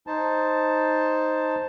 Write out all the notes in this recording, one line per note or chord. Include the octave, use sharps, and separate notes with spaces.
D#4 C5 A5